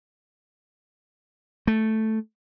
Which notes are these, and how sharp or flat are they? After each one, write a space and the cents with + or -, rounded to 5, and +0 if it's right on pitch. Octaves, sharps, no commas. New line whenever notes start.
A3 +0